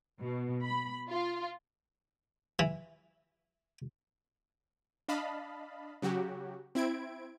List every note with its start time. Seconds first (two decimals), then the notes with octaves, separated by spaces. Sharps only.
0.21 B2
0.64 B5
1.10 F4
2.59 E3
5.08 D4 D#5 F5 A5 B5
6.02 C#3 F#3 F#4 G4
6.75 C4 E4 G#6 D7